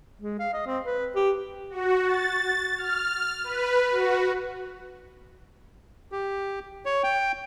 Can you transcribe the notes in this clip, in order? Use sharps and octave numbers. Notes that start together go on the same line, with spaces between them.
G#3
F5
D#5
C4
B4
G4
F#4
A6
F6
B4
F#4
G4
C#5
G5